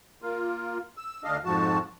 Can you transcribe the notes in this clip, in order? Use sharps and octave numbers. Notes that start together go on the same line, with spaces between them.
A#3 F4
E6
D2 D4 D#5 F5
F2 G#2 F3 F#4 A5